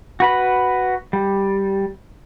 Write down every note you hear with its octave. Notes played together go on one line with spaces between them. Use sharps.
F#4 B4 B5
G3